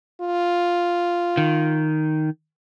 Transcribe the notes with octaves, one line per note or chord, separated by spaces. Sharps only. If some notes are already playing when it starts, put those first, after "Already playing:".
F4
D#3